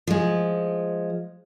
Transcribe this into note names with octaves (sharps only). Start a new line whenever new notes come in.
F3 G#3